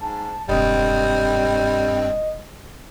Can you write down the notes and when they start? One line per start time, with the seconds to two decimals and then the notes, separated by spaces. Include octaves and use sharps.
0.01 G#2 A5
0.49 E1 G2 G3 C4 D#5